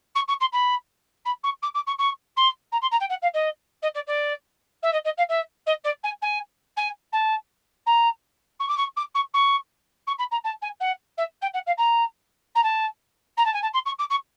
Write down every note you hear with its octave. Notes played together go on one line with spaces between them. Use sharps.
C#6
C#6
C6
B5
B5
C#6
D6
D6
C#6
C#6
C6
A#5
C6
A#5
G5
F#5
F5
D#5
D#5
D5
D5
E5
D#5
D#5
F5
E5
D#5
D5
G#5
G#5
G#5
A5
A#5
C#6
D6
C#6
D6
C#6
C#6
C#6
B5
A#5
A5
G#5
F#5
E5
G5
F#5
F5
A#5
A#5
A5
A#5
A5
G#5
A5
C6
C#6
D6
C#6